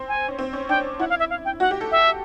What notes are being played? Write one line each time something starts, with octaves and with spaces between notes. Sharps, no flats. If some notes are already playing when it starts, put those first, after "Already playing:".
Already playing: C4
G#5
C#4
C4
C#4
D4 G5
E4 F#5
F5
E5
F5
G5
F#4 F#5
G4
A4
E5